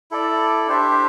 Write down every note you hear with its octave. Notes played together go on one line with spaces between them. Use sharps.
E4 A4 D5
D4 G4 C5 E5